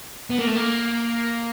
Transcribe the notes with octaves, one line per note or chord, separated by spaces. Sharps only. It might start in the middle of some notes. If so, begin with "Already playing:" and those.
B3
A#3
A3
A#3